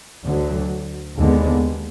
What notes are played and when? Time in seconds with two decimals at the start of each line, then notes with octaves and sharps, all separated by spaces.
0.24 D2 D3 F#3
1.17 D#2 D3 G#3 B3